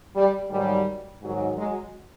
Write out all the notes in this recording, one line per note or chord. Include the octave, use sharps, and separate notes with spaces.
G3
G#2 D#3 F#3 G3
G#2 D#3 F#3
F#3 G#3